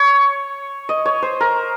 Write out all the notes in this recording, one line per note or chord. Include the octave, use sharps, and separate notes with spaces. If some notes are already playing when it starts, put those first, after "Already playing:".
Already playing: C#5
D#5
C#5
C5
A#4